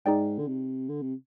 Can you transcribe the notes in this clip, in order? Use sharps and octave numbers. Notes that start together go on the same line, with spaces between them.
G#2 D#4 G#4 D5 G5
D3
C3
D3
C3